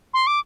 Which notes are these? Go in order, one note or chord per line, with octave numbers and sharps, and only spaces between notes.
C6
D6